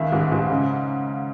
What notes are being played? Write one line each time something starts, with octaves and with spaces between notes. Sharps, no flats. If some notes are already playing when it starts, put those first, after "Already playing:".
Already playing: C#2 D#3 E5
G#2
G#2
C#3